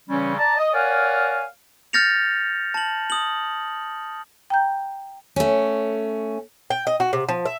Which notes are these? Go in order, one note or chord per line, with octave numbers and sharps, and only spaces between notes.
C#3 E3 G3 C4 C#4
D5 A5 A#5
D#5
A#4 C#5 D5 F5 F#5 G#5
F6 G6 A6 A#6 C#7 F7
A5 F#7
D#6 F#7
G5 A#5 G6
A3 C#4
G5
D#5
F#4
C3
F3
E5